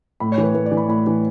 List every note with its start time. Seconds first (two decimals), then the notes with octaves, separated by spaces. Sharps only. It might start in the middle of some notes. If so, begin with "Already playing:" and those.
0.20 A2 B5
0.32 C#5
0.38 E3
0.43 B4
0.54 A2 B4
0.66 D5
0.71 E3
0.77 B5
0.88 A2 B5
1.07 E3